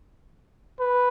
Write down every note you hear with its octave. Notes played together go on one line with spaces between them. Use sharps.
B4